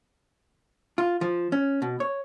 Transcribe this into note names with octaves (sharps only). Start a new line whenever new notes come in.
F4
F3
C#4
B2
C#5